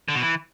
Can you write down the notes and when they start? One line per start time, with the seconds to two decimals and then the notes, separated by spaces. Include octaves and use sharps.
0.08 D3
0.15 B2
0.22 E3